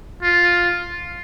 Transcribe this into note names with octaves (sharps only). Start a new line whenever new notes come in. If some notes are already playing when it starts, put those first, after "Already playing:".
F4